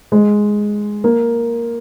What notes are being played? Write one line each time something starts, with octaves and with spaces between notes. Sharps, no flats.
G#3
A#3